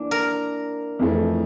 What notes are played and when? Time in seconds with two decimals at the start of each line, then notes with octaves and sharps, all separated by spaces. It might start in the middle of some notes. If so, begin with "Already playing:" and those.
Already playing: E3 A#3 D4
0.11 A#4
0.99 F2 E3 A3